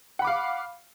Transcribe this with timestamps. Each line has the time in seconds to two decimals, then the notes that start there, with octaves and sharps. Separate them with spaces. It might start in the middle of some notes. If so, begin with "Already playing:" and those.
0.19 F#5
0.22 B5
0.25 D6
0.27 F5